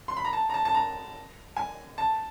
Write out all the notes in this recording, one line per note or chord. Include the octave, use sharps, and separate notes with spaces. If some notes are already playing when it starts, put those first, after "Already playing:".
C6
B5
A#5
A5
A#5
A5
A5
A#5
G#5
A5